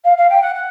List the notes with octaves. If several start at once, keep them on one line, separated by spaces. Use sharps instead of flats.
F5
F5
G5
F#5
F#5